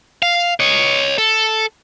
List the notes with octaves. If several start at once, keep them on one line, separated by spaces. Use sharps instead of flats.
F5
C#5 D#5
A4